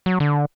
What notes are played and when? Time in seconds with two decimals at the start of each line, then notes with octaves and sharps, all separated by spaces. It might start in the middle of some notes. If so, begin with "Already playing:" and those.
0.06 F#3
0.20 D3